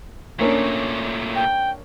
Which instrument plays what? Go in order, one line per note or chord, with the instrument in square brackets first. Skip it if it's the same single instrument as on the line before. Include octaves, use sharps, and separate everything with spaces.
[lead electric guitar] A#2 A3 [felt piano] A#3 C#4 D4
[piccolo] G5